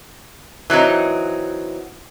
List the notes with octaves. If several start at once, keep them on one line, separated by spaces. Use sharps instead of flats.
E3 F#3 C4 D#4